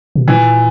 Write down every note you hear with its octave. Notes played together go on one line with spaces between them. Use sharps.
B2
A#2 E3